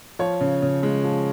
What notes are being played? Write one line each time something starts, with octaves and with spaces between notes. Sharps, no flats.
F3 C#5
C#3
C#3
G#3
F3